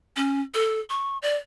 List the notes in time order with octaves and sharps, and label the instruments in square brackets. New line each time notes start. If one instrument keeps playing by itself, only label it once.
[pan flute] C#4
A4
C#6
D5